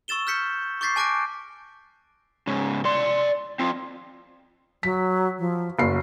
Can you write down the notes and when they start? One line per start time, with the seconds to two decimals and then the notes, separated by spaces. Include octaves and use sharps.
0.08 C#6 E6 A6 E7 G7
0.27 F6 G6 B6 C#7
0.81 C#6 D6 G6 A6 B6 C7
0.96 G#5 A5 D6 F#6 A#6 D7
2.47 G#2 C#3
2.85 D5 C6
3.59 C4 F4
4.83 F#3 B6
5.39 F3
5.79 F#1 F#4 C7